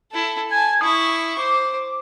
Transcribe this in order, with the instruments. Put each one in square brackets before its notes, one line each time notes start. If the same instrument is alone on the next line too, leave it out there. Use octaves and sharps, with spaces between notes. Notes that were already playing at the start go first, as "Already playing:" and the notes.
[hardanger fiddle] E4 A4
[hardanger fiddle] G#5 A5 [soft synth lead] G#6
[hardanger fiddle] E4 C#6 [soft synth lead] D#6
[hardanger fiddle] C5 [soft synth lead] D6